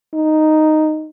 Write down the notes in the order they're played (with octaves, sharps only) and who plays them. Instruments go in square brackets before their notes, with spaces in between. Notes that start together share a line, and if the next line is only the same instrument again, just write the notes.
[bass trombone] D#4